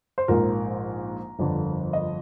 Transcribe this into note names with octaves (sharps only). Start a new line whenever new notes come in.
C5
A#1 G#2 F3 A#4
G1 F2 D3
D#5